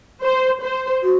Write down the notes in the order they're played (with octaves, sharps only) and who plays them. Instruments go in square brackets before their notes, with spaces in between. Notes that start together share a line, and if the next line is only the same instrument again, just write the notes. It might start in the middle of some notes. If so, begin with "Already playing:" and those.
[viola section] C5
C5
[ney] F#4